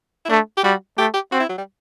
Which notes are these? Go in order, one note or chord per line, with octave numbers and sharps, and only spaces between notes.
E4
A3 D4
G4
G3 F#4
A3 G4
G4
C4 F#4
E4
F#3
G3